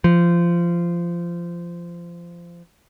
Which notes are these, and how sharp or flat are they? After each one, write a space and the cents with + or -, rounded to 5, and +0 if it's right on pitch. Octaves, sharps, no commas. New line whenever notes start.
F3 -20